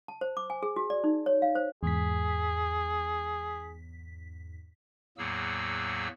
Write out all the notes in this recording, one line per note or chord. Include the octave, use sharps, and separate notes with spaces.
A5
C5
D6
G#5
G#4
F#4
D5
D#4
C#5
F5
C5
E2 G#2 G#4 B6
E2 A2 F#3 A#3 G#4 E6